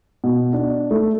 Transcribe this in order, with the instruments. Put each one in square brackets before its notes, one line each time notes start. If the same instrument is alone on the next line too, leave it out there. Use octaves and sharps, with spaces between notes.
[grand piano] B2
D4
A3